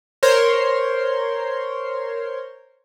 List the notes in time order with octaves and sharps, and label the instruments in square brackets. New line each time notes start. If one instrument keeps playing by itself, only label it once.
[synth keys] A#4 C5 C#5 C6